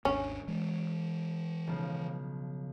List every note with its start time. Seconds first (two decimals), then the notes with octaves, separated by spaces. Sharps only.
0.05 G#1 D#2 C#4 D4
0.48 E3 G#3
1.67 B1 C#3 F3